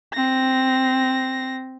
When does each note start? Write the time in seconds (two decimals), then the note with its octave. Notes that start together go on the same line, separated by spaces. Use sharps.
0.14 C4 A#6